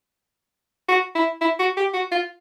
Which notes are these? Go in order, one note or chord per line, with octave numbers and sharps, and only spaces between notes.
F#4
E4
E4
F#4
G4
F#4
F4